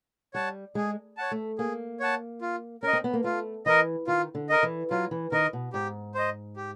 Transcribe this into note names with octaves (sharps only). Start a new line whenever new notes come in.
G3 C#5 F#5 A5
G#3 G#4
C#5 F#5 A5
A3
A#3 G#4
C#5 F#5 A5
F4
C#4 A#4 D#5
C4
B3
A#3
A3 F4
E3 A#4 D#5
D#3 F4
D3
A#4 D#5
E3
F#3 F4
E3
D#3 A#4 D#5
B2
G#2 G4
C5 D#5
G4